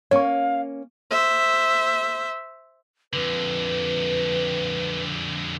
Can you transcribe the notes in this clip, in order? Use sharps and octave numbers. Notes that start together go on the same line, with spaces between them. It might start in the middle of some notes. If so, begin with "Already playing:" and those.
A#3 C#4 C#5 F5 C#6
C5 E5
F2 D3 B4